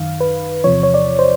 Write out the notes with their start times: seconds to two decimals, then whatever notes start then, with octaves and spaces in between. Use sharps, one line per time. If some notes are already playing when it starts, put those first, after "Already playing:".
Already playing: F#2 D#3 F5
0.21 B4
0.64 E2 C3 F3 C#5
0.83 C#5
0.94 D5
1.19 C5